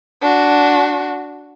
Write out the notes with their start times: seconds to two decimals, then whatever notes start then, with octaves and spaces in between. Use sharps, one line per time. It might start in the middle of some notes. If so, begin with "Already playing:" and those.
0.20 D4 F#4